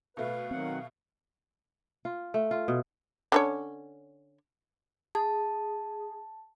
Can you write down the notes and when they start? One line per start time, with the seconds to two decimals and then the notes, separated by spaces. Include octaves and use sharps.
0.17 B2 A3 B4 F5
0.51 D#3 F#3 C4 F#5
2.05 F4
2.34 A3
2.51 F4
2.68 B2
3.32 D3 C#4 C#5
5.15 G#4 A5